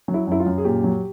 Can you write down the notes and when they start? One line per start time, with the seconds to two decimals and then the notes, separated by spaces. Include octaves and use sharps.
0.08 F#3
0.14 E4
0.27 F#2 E4
0.40 F4
0.46 F#2
0.58 G#4
0.65 A#2 G4
0.84 F#3